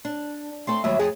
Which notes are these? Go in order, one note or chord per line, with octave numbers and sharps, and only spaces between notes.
D4
A3 C4 A4 C6
D#2 F#3 G3 E5
F2 G#4